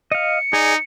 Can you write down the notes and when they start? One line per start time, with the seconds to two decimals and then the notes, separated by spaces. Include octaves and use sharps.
0.12 D#5 F5 C#7
0.53 D#4 G#4 D5 G#5